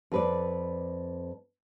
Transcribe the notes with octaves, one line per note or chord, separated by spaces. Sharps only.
F2 B4 D5